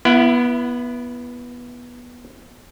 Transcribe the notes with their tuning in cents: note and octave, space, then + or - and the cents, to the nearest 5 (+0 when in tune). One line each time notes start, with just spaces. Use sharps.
B3 -20 E4 +20